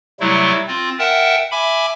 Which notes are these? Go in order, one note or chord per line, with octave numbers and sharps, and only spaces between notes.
C3 F#3 G3 A3 E4
C4 F4
A#4 E5 F#5 G5 A5
E5 G#5 B5 D6